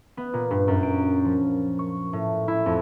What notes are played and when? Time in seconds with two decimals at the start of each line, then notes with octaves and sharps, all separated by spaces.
0.17 B3
0.33 A#2
0.51 G2
0.68 F#2
0.83 D7
1.25 F3
1.79 C#6
2.13 A2
2.48 E4
2.66 F2